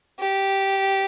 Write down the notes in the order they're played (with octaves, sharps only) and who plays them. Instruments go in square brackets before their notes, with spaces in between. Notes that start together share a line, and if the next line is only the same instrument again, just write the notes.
[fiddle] G4